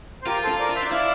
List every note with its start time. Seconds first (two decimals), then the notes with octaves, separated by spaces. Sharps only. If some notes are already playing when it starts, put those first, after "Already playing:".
0.22 C5
0.26 F4 G4 A#4
0.43 F4 A4 C5
0.60 A#4 D5
0.70 F4
0.75 C5 E5
0.82 D4
0.91 E4 D5 F5